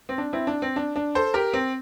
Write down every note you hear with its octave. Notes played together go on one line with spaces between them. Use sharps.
C4
D4
C4 E4
D4
C4
D4
D4
A4 C5
G4 A#4
C4